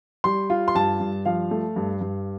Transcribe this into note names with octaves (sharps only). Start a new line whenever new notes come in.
G3 C6
F4
C6
G2 A5
G2
F3 F5
A3
G2
G2